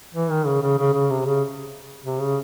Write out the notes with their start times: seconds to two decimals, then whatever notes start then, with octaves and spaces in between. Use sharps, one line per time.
0.14 E3
0.31 D#3
0.46 C#3
0.62 C#3
0.79 C#3
0.93 C#3
1.10 C3
1.25 C#3
2.04 C3
2.21 C#3